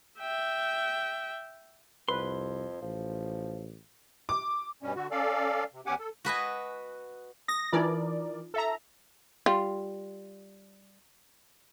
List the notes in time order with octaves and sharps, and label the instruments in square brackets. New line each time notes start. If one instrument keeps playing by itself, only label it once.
[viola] E5 G5
[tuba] C2 [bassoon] F2 [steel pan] B4 [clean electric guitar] C6
[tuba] A1 [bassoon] F3
[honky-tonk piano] D6
[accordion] G2 B2 G3 C#4
D3 F#4
C#4 A4 D5 F5
C3
E2 C#4 G4 F#5 G#5 D6
A4
[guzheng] F#4 B4 D#5 G#5
[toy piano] D#6 [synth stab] A#6
[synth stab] E3 A#4 D5 [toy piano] D#4 F4
[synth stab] A4 E5 A#5
[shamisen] G3 F4